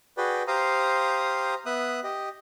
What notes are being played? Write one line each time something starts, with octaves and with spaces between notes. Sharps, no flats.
F#4 G#4 B4 D5 G5
G4 C5 F5 A#5 D#6
B3 E5 D#6 F#6
G4 D#5